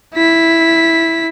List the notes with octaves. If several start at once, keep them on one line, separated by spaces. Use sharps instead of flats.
E4 B6